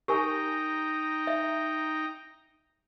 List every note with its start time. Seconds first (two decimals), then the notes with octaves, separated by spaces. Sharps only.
0.08 D#4 G4 A#4 G5 G#5 A#5
1.27 E5